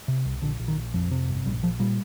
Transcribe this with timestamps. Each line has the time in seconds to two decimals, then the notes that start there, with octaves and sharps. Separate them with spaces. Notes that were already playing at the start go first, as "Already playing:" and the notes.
0.08 C3
0.25 C2
0.42 A#1 D3
0.60 A#1
0.68 D#3
0.76 A#1
0.94 F2 F3
1.11 C3
1.29 G1
1.46 A#1 G3
1.63 A#1 F3
1.80 A#2 G3